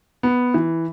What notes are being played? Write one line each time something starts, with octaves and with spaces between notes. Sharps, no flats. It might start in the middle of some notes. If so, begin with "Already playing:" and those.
B3
E3